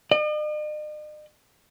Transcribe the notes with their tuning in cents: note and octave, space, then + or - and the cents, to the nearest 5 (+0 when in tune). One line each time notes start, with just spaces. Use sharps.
D#5 -45